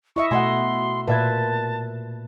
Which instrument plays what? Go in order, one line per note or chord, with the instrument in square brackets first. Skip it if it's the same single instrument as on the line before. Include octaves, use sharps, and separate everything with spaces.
[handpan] E4 D#5 E5 [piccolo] C#6
[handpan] B2 A3 D#5 [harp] F#5 G#5 [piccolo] C6
[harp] A#2 E5 G#6 [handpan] B4 [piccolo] A5